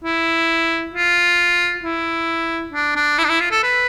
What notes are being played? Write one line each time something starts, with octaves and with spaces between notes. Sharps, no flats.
E4
F4
E4
D4
D4
E4
D4
E4
F4
A4
B4